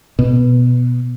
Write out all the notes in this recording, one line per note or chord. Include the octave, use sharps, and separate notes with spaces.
B2